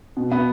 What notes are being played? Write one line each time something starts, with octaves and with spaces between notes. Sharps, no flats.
B2
B3 B4